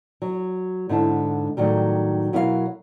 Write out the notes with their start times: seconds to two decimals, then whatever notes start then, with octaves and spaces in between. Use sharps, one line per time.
0.22 F#3
0.89 G#2 D3 E4 A5
1.57 A2 D#3 F#3 G3
2.32 B2 F#3 E4 A#4 C#5 F5